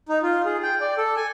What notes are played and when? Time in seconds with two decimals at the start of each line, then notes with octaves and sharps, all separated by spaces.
0.09 D#4
0.23 F4
0.46 G#4
0.63 G5
0.81 D5
0.97 A4
1.16 G#5